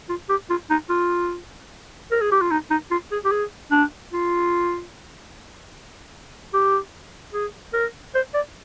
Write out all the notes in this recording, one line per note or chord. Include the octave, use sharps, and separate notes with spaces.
F4
G4
F4
D#4
F4
A#4
G#4
G4
F4
D#4
D#4
F4
G#4
G4
G#4
D4
F4
G4
G#4
A#4
C5
D5